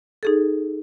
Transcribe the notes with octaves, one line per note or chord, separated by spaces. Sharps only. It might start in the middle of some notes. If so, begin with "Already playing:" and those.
D#4 G#4 A4